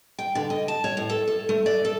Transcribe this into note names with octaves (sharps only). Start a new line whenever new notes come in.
G5
D3
D#5
A5
C#5
A2
A4
A4
A3
D5
A4